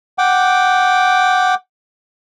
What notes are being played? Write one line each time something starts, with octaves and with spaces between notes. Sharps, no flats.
F#5 G5 D6